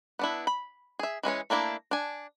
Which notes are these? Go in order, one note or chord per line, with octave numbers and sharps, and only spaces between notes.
B3 D4 E4
B5
G#4 E5
E3 G#3 C#4 C#5
A3 A#3 D4 E4
D4 G#5